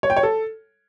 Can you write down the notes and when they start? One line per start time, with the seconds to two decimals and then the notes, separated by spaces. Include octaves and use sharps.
0.03 C#5
0.10 G5
0.17 C#5
0.23 A4